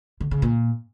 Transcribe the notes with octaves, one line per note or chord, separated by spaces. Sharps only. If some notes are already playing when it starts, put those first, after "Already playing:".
D3
C#3
A#2